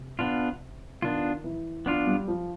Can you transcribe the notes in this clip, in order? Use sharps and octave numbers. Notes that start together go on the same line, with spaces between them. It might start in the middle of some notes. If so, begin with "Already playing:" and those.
Already playing: C3
B3 D4 F4
D#3 B3 D4 F4
E3
F3 B3 D4 F4
G3
F3